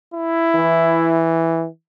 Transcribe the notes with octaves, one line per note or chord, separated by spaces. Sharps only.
E4
E3